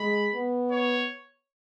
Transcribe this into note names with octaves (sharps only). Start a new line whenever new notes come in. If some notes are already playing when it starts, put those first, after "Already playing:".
Already playing: G#3 B5
B3
C#5